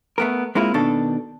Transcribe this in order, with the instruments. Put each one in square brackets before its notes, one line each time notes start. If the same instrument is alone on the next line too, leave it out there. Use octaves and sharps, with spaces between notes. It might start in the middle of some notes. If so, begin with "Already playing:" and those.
[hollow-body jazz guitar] A3 B3 A#4
G#3 A#3 C4 E4 F4
B2 D#3 D4 A4